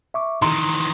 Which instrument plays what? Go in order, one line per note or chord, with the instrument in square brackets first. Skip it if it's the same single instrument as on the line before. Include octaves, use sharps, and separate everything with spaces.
[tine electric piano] E5 C#6 D6
[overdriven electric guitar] D#3 E3 [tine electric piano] A#5 [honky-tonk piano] C6